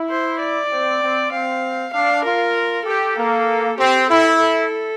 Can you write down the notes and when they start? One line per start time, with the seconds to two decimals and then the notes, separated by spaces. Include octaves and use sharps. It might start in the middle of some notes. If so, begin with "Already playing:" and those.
Already playing: E4
0.10 C5
0.40 D5
0.72 C4
1.02 C4
1.32 C4 F5
1.94 D4 F5
2.25 F4 A#4
2.85 G4 A4
3.17 A#3
3.78 C4 G4
4.09 E4 A4
4.40 A4